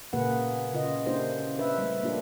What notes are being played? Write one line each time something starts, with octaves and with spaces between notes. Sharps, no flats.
A#2 C#3 A#3 G#4 B4 F#5
C#3 F4 D#5
A#3 C#4 D4 E4 G4 C5
D4 B4 E5
G3 A3
A#3 D4 F4 G4